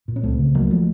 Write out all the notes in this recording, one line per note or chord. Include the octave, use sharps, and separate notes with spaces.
A#2
C#4
C#2 A3 C4
C#3
C#2 F#3 A#3
F3 A3